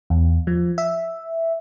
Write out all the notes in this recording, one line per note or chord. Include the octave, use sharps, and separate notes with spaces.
E2
F3
E5